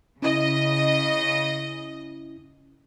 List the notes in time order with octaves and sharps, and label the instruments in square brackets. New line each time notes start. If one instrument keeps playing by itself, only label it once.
[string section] C#3 D#5 [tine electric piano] C#4 E4